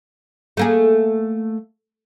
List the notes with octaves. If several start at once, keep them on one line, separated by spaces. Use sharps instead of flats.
A3 A#3 G#4